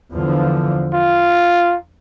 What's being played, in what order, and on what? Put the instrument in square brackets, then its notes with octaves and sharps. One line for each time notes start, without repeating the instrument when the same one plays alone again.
[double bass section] E2 D3 F3
[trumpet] F4